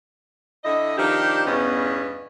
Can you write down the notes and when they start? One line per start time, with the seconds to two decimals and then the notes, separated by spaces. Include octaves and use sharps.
0.64 D3 E4 D#5
0.98 D#3 F3 D4 G4
1.46 E2 G2 B2 B3 C#4